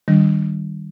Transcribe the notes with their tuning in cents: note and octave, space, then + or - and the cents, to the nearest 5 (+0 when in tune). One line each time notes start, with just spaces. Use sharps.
D#3 +0 G3 +0 D4 +0